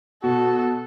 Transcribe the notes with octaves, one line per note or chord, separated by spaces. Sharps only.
B2 F#4 A4